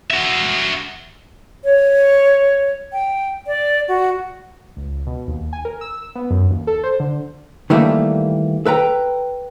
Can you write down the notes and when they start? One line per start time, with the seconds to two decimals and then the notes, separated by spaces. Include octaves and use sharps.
0.11 F#4 E5
1.64 C#5
2.92 G5
3.47 D5
3.88 F#4
4.77 C#2
5.07 B2
5.28 D#2
5.53 G#5
5.65 A#4
5.81 E6
6.15 B3
6.30 F#2
6.50 D#2
6.67 A4
6.83 C5
7.00 D3
7.70 D#3 E3 G3 A3 A#3
8.66 A4 B4 G5 A#5